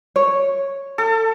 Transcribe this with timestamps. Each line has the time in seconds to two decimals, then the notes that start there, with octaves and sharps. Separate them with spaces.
0.16 C#5
0.98 A4